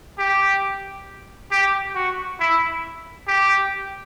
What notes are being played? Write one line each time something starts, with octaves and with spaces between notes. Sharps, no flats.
G4
G4
F#4
E4
G4